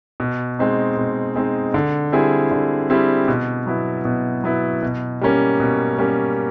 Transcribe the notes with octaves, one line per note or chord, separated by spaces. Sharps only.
B2
G#3 C4 D#4
B2
G#3 C4 D#4
D3
G3 C4 E4 G#4
D3
G3 C4 E4 G#4
B2
F#3 B3 E4
B2
F#3 B3 E4
B2
G3 A#3 C#4
B2
G3 A#3 C#4